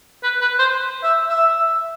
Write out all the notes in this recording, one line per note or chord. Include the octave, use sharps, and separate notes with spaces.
B4
B4
C5
E5
E5